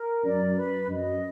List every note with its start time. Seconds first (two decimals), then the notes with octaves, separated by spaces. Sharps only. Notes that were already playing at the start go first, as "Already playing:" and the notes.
Already playing: A#4
0.24 F#2 D5
0.56 B4
0.88 F#2 D#5